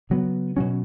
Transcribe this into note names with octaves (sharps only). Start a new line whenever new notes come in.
C#3 F#3 B3
B2 F#3 C#4